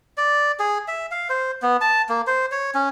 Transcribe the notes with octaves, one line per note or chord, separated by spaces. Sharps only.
D5
G#4
E5
F5
C5
B3
A5
A#3
C5
C#5
C#4